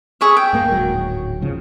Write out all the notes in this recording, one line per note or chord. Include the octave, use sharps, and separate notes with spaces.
G#4 C#5 E5
G5
G#2 A#3
D1 G#1 F#3
G#2 C#3 F3